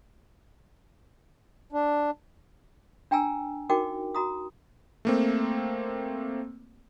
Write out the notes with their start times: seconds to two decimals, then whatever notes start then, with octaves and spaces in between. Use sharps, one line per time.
1.72 D4
3.11 D4 G5 G#5 A#5 E6
3.69 D#4 F#4 A#4 G5 D6
4.15 F#4 A#5 D#6
5.05 A3 A#3 C4